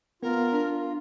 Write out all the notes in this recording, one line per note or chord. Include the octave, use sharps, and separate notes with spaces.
B3 F4 A#4
D4